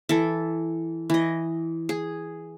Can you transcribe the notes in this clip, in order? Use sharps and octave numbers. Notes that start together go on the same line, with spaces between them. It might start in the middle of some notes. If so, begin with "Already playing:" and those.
E3 A4
E3 D#5
G#4